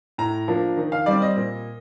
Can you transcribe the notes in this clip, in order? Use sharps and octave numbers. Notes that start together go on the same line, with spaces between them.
A2 A#5
F3 A#3 D4
D#3
F5
G3 C4 D5
D#5
A#2